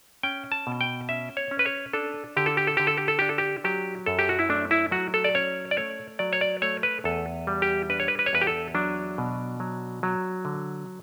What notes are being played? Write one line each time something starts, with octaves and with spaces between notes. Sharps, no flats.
C#4 G5
A5
B2
G5
C#4 E5
C#5
C#4
B4
C#5
D4 A4
D3 G4
A4
G4
A4
D3 G4
A4
G4
A4
D4 G4
A4
G4
F#3 G4
F#2 A4
G4
F#4
E4
A3 D4
E4
F#3 F#4
A4
D5
C#4 C#5
D5
A3 C#5
F#3 D5
C#5
D5
A3 C#5
B4
E2 A4
G3
G4
D4 B4
C#5
B4
B4
C#5
E2 B4
G4
A4
F#3 D4
B2
F#3
F#3
D3